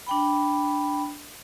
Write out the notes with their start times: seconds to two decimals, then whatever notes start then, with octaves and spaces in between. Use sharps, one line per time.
0.07 D4 G5 B5